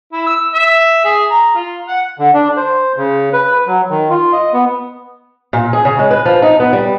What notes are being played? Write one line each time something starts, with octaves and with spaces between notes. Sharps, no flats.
E4
E6
E5
G#4
A#5
F4
F#5
D3
D4
C5
C#3
B4
F#3
D#3
F4
D#5
B3
A#2
G#4
C#3
G#3
B4
F3
D#4
B3
G3